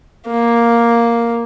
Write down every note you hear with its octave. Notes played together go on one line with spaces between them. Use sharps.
A#3